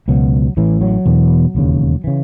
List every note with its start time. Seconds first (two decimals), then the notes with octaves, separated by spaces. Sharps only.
0.08 C#2 B2 F#3
0.57 A1 A2 E3
0.81 F#3
1.06 E1 E2 B2
1.55 E1 D#2 C#3
2.04 C#3 E3